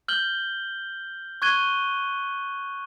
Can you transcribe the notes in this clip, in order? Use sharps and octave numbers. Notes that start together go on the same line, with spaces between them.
F6 G6 F#7 G7
C#6 F#6 G#6 D#7 G7